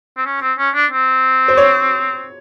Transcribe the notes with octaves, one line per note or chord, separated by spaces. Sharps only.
C4
C#4
C4
C#4
D4
C4
C5
C#5